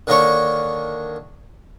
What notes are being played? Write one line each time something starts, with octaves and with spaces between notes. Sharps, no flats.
D3 D#3 A#3 D4 C#5 C#6